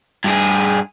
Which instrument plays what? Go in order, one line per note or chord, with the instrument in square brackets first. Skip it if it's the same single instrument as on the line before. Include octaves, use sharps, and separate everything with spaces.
[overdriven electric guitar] G2 G#4